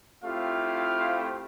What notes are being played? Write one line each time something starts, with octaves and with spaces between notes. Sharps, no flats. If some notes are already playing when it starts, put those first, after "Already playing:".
A3 C4 E4 F4 G4 F5